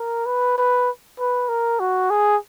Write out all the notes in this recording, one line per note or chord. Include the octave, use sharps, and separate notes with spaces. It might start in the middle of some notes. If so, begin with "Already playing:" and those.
Already playing: A#4
B4
B4
B4
A#4
F#4
G#4